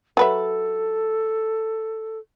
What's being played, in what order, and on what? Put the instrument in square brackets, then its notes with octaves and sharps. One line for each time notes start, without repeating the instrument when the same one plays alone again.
[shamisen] F#3 B4 E5 [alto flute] A4